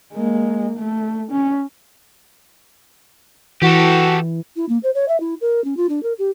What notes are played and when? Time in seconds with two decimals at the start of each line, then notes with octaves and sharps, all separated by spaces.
0.14 G#3 A#3
0.78 A3
1.31 C#4
3.62 E3 F#4 G4 A4
4.56 E4
4.69 A#3
4.83 C5
4.95 C#5
5.08 E5
5.20 E4
5.41 A#4
5.64 C#4
5.77 F4
5.89 D4
6.03 A#4
6.18 G4